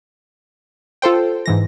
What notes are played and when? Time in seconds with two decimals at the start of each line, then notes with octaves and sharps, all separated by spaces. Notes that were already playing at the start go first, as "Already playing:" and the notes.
1.02 F4 A4 C5 G5
1.46 G#2 E3 A#6